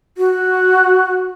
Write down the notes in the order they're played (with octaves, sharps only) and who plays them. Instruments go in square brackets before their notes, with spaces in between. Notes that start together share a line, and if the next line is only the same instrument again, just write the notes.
[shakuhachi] F#4